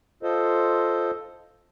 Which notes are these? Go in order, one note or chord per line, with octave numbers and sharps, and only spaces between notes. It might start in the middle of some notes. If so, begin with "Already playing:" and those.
F4 A4 C5 D#5